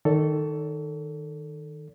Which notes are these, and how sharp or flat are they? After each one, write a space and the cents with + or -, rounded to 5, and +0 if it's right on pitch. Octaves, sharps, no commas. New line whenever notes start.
D#3 -10 A4 +5 C#5 +40